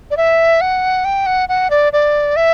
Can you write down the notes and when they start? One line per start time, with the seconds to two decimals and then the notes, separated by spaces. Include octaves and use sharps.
0.11 D5
0.17 E5
0.61 F#5
1.05 G5
1.26 F#5
1.49 F#5
1.70 D5
1.93 D5
2.36 E5